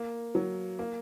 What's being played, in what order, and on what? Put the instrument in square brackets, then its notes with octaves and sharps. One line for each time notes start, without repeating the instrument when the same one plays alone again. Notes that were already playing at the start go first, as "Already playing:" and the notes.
Already playing: [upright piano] A#3
F#3
A#3